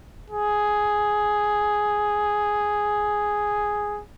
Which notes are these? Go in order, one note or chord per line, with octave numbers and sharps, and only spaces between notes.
G#4